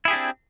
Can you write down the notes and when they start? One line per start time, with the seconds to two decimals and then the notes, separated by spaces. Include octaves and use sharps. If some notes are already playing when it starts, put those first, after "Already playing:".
0.05 E4
0.08 G#4
0.10 G4
0.13 D4
0.16 C4